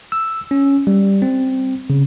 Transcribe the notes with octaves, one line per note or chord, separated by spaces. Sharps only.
E6
C#4
G3
C4
C#3